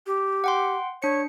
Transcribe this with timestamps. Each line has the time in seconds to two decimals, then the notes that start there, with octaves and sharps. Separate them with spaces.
0.07 G4
0.44 F#5 G5 C6
1.02 D4 C#5 C#7